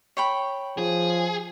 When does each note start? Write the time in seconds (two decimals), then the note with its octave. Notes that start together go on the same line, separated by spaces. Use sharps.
0.17 C#5 G5 B5
0.78 F3 G#4